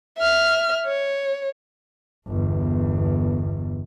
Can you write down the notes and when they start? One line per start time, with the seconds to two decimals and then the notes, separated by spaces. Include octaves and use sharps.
0.18 E5 F6
0.86 C#5
2.27 G1 E2